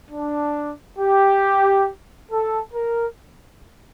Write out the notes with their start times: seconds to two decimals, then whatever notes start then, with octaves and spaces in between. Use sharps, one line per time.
0.11 D4
0.98 G4
2.30 A4
2.74 A#4